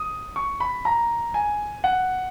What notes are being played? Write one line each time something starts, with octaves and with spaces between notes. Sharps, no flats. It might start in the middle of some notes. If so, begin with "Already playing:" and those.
Already playing: D#6
C#6
B5
A#5
G#5
F#5